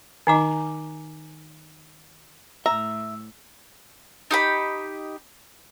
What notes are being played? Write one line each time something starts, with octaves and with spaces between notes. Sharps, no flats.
D#3 D#4 D#5 G#5 A#5 D6
A2 E5 A#5 E6
D#4 G4 B5